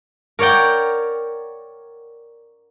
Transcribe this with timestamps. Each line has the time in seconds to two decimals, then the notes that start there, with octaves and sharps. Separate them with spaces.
0.39 A#4 C#5 D5 F#5 G5